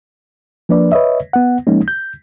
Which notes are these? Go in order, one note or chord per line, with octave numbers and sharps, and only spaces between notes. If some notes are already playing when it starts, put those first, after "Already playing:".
F3 A#3 D4 B4 D5
B4 C#5 D#5 E5
B3 F#5
F3 G#3 A#3 C#4 D#4
G6